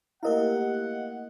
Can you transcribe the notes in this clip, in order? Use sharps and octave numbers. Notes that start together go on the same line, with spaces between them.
A3 A#3 E4 G4 A#4 D#5 F5 F#5